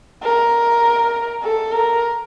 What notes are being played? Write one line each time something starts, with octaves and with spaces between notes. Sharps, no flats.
A#4
A4
A#4